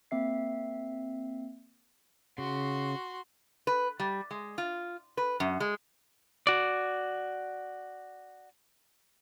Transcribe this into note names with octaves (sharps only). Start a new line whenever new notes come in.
A#3 C4 E5 C7
C#3 F#4 C6
B4
G3
G#3
F4
B4
F#2
G#3
F#4 D5